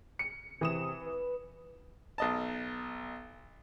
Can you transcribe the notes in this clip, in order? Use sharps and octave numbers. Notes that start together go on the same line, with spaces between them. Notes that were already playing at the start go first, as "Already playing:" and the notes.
C#7
C3 E3 D#6 E7
B4
B1 D#5 A5